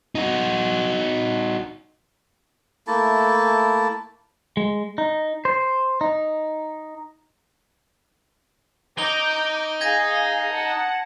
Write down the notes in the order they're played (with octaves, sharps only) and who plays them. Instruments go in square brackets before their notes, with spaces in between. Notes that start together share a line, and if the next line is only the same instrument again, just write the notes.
[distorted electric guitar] D#4 F#4
[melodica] A3 A#3 E4 A5
[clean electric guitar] G#3
D#4
C5
D#4
[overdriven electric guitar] D#4 [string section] A#5 D6 G6 [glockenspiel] G7
[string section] G#4 F5 [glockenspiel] G#6 A#6 D#7
[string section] F#5 A5